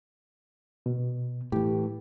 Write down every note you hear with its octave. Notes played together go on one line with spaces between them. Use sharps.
B2
A2 E3 G4